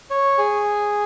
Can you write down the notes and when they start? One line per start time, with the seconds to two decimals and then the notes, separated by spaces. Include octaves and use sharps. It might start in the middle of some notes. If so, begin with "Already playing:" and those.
0.10 C#5
0.38 G#4